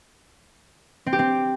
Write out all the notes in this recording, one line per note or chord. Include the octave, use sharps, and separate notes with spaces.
C4
G4
C4